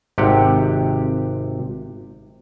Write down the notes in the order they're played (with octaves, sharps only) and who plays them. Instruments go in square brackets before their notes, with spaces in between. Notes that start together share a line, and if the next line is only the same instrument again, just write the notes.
[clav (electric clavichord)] G#1 C3 G4 F#5